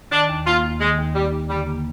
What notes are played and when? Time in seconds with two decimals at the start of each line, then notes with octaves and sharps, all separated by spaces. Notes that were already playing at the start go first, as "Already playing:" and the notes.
0.12 D#3 D4
0.29 D#2
0.46 A#3 F4
0.64 D#2
0.81 D#3 G#3
0.98 D#2
1.15 G3 A#3
1.32 D#2
1.50 D3 G3
1.67 A#3